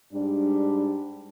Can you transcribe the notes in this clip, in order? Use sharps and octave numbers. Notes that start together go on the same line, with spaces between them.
G#2 G3 D4